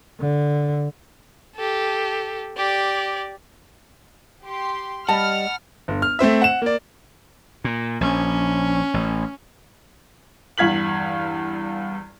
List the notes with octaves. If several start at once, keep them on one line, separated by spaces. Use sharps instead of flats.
D3
G4 A4
G4 D5
G4 C6
G3 D#5 F#5 A5 B5 F6
G1
F6
A3 C4 C5 E5
F#5 E7
A#3 D5
A#2
A#1 C#4
A1
E2 G2 F5 G#6 B6 F#7